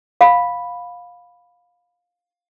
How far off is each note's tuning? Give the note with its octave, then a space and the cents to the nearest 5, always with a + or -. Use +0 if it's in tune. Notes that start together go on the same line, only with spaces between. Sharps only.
F5 +20 B5 +0